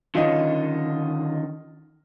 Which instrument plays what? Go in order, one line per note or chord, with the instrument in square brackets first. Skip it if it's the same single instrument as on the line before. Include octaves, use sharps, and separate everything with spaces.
[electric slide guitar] D3 D#3 C#4 [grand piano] F4 D#5